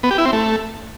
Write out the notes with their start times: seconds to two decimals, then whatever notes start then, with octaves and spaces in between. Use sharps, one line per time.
0.03 B3
0.11 G4
0.18 E4
0.25 C4
0.33 A3